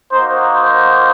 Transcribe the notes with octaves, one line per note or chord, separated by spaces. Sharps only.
A#3 D#4 F#4 C5
C5